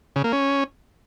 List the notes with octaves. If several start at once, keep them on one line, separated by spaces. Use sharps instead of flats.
C#3
A#3
C#4